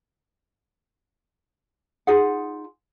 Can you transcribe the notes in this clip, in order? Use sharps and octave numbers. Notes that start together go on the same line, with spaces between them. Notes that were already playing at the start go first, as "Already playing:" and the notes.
D#4 F4 G#4 F#5